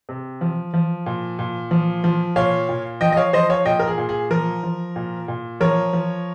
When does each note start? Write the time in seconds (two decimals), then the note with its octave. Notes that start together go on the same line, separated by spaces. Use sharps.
0.09 C3
0.41 F3
0.74 F3
1.06 A#2
1.39 A#2
1.71 F3
2.04 F3
2.36 A#2 C#5 F5
2.69 A#2
3.01 F3 D#5 G5
3.12 D#5
3.17 C#5 F5
3.33 F3 C5 D#5
3.50 C#5 F5
3.65 A#2 D#5 G5
3.79 A#4
3.87 G#4
3.98 A#2
4.09 G#4
4.30 F3 A#4
4.63 F3
4.96 A#2
5.28 A#2
5.60 F3 A#4 C#5
5.93 F3